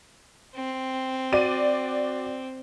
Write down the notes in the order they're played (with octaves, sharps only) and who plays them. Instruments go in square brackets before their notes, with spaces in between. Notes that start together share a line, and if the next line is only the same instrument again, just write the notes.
[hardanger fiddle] C4
[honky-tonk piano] F#4 D5 D#7